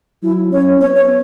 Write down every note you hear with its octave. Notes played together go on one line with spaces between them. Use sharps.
F#3 E4
C#4 C#5
B3 C#5
C#5